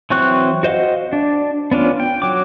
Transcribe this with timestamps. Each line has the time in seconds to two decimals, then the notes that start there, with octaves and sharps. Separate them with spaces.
0.10 E3 F#3 C4 C#6 F#6
0.63 F#4 C5 D#5 F5 F#5
1.13 D4
1.71 B3 C#4 D4 F4
2.00 G5
2.22 F#3 D6